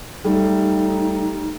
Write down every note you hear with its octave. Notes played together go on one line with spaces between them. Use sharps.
G3 A3 D#4